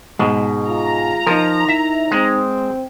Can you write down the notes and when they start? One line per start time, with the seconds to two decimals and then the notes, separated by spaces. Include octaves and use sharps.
0.19 G#2 B2 G#3
0.67 F4 A#5
1.27 F3 D#4 A#4
1.69 E4 E5
2.11 G#3 C4